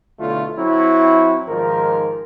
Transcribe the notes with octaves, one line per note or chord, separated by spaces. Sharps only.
B1 D3 A3 E4 F4
F#3 C4 E4
G#2 D#3 F3 A#4